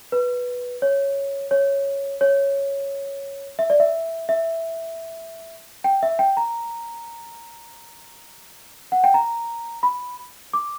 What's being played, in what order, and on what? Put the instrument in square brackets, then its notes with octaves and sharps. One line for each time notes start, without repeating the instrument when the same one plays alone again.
[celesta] B4
C#5
C#5
C#5
E5
D5
E5
E5
G5
E5
G5
A#5
F#5
G5
A#5
B5
D6